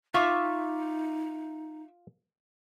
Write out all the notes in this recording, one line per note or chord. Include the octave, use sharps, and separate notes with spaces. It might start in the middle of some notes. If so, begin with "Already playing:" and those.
D#4 F4 E5 C#6 D6